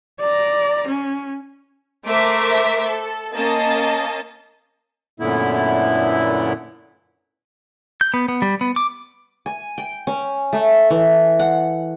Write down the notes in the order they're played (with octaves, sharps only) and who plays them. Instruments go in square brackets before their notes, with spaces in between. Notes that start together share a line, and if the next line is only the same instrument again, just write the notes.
[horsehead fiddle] D5 A#5
C#4
[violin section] A3 A#4 C5 E5 D6 B6
A4
A#3 C#4 D#5 A5
[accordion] F#2 A#2 D3 A3 B3 E4
[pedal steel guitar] G6
B3
B3
G3
B3
D6
[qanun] G#5
G5
C#4
A3
E3
F#5